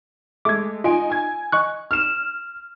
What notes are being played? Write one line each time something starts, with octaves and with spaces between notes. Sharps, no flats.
G#3 A3 D6 G#6
D#4 F4 G#5 D7
G#5 G#6
D#5 C#6 F#6
F6 E7